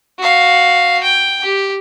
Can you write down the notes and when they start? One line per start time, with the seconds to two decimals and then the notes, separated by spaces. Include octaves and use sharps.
0.19 F#4 F5
1.04 G5
1.43 G4